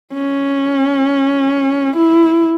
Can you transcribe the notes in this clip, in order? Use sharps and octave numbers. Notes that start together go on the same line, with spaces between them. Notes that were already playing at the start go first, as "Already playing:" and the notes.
C#4
E4